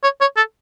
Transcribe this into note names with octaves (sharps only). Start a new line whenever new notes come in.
C#5
C#5
A4